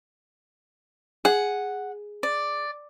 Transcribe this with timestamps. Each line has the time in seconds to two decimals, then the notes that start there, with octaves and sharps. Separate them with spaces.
1.25 G#4 F#5
2.23 D5